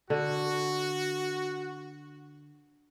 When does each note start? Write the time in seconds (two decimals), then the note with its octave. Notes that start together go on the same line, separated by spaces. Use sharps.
0.10 D3 F#4